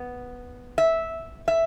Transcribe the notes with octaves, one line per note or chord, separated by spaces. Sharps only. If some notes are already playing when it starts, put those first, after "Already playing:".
Already playing: B3
E5
E5